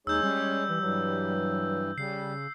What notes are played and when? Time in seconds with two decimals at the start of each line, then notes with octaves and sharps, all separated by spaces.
0.07 D#2 G#3 D#4 G#4 C#5 E6 G6
0.23 G3 C#4
0.69 E3
0.81 G2 E3 F#3
1.98 C#3 G3 C7